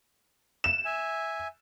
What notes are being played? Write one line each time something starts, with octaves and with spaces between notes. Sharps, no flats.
E7
E5 G#5